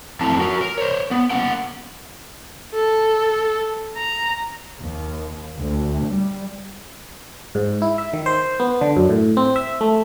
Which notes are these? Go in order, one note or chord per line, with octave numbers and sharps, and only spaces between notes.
F2 A3 C4 E4 A5 A#5
F#4 A#4
A#4
C5 C#5
B3
A#3 C#4 F#5 G5
A4
A#5
D#2
D2
G3
G#2
E4
E5
D#3
C5
B3
D3
F#2
A2
C4
E5
A3